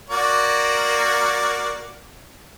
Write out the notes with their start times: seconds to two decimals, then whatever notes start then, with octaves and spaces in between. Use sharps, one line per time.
0.10 A#3 F#4 D5